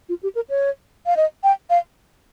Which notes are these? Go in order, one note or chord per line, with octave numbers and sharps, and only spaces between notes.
F4
G4
A#4
C#5
F5
D#5
G5
F5